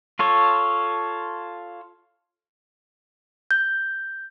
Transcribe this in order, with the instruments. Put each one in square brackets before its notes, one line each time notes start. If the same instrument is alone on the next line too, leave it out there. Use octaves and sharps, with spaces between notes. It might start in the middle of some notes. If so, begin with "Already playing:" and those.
[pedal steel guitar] F4 A4 C#5
[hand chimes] G6